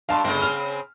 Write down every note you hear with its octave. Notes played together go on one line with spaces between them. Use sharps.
G2 F5 A5 C6
G1 C#3 C4
F6